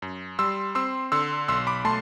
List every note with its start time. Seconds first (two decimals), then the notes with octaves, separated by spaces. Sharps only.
0.02 F#2
0.39 G3 C6 E6
0.75 C4 C6 E6
1.12 D3 C6 E6
1.48 B1 C6 E6
1.67 B5 D6
1.85 A3 A5 C6